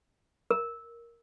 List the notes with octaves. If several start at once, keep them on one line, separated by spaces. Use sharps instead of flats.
A#4